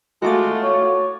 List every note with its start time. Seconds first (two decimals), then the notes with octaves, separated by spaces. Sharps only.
0.22 G#3 A3 F4 F#4 D6 A6
0.62 C#5